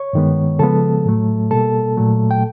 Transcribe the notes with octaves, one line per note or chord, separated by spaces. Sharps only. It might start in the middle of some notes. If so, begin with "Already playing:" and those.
Already playing: C#5 C#6
G2 D#3 G#3 B3
C#3 F3 G#3 B3 A4 A5
A2 F#3 A3
B2 G3 A#3 A4 A5
A#2 F#3 A3
G5